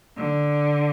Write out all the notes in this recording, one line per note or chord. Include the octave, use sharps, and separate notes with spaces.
D3